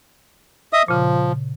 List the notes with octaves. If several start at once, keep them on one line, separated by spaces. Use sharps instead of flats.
D#5 E5 D#6
A#2 C#3 F3